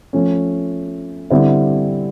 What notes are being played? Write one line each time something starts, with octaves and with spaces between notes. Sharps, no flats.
F3 A3 C#4
D3 G3 C4 E4